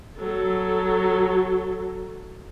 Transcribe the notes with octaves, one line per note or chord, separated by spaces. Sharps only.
F#3 A4